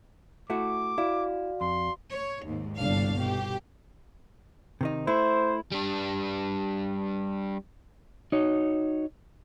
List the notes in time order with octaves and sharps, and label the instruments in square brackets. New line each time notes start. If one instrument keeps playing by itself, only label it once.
[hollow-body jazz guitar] A3 E4 F#4 [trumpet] D6
[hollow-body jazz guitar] E4 [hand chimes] F#4 D5 F5
[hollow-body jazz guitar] F2 [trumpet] C6
[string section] C#5
D#2 G#2
G1 C2 G3 D4 F5
B2 G4
[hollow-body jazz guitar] C3 D#3 D#4
[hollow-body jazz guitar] A3 E4 [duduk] C5
[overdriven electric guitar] G3 D4
[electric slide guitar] D#4 F#4 C#5